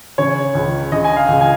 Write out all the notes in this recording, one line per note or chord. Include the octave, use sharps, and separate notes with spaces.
C#3 C#5
C#2
C#3 D#5
G#5
F5
C#2
G#5